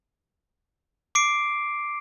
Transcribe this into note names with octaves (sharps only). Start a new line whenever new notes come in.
D6 C7 D7